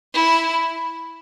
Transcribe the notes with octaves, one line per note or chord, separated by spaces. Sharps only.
E4